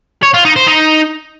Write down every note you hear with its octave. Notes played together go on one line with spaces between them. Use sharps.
C#5
F4
D#4
C5
D#4